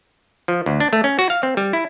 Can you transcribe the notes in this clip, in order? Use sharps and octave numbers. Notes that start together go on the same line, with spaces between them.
F3
D2
D4
A3
C#4
F#4
F5
C4
G3
E4